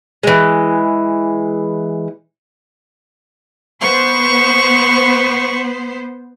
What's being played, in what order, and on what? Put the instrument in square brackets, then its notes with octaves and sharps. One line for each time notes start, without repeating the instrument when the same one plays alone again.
[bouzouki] E3 G#3
[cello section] B3 C5 [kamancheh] C#6